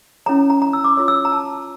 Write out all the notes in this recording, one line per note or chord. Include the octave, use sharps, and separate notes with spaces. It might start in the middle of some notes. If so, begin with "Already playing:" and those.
C#4 E4 A4 C#5 A#5
A#5
A#5
E6
D6
F4 A4 C#5 E6
E6
A#5
A5